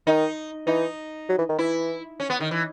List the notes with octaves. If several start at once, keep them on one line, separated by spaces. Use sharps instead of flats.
D#3 D#4
E3 D#4
F#3
E3
D#3
E3 E4
C#4
B3
D#3
E3